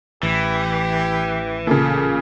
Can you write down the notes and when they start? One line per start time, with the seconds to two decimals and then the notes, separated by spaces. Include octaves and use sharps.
0.23 A1 E3 G4
1.67 A#2 C#3 A4